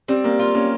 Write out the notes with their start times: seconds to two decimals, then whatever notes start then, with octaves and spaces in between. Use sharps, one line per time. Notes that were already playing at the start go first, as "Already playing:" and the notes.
0.08 G3 C4
0.24 A#3
0.39 F4
0.55 A#3 C#4